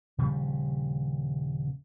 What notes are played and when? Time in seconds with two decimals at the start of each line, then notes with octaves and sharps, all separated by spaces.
0.18 D#1 C#3 F3 G3